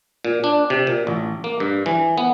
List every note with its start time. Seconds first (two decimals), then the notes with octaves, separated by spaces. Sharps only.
0.25 A#2
0.44 D4
0.70 C3
0.87 A#2
1.07 A1
1.44 A#3
1.60 G2
1.86 E3
2.18 B3